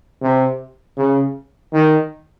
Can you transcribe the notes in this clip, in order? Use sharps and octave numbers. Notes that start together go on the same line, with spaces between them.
C3
C#3
D#3